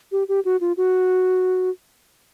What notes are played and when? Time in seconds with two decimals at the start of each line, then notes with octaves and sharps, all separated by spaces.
0.12 G4
0.29 G4
0.45 F#4
0.61 F4
0.77 F#4